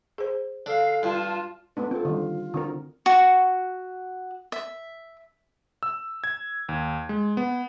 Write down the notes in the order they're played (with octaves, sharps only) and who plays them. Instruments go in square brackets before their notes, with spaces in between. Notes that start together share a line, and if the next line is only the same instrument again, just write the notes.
[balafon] G#4 C5
[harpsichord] D3 [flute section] F5
[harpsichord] G2 [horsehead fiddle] F4 [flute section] A5
[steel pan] A3 B3 D4 [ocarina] B4
[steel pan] C4 A4 [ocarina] F4
[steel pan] D3 D#3 G3
D3 C4 A#4
[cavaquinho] F#4
E5
[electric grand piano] E6
G#6
D#2
G#3
B3